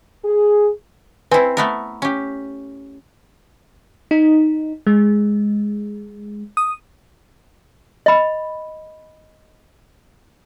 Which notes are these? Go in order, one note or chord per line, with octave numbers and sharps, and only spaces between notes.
G#4
C4 E4 B4 G#5
A3 B3 A#4
C#4 G4
D#4
G#3
D#6
D#5 B5